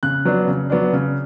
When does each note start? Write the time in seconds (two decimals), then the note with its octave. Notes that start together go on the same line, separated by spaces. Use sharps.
0.03 C#3 F#6
0.25 F#3 B3 D4
0.48 C#3
0.70 F#3 B3 D4
0.93 C#3